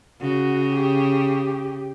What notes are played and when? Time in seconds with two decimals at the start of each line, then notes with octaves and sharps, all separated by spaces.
0.21 C#3 F#4
0.74 G4